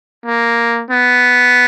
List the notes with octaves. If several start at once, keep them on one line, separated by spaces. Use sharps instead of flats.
A#3
B3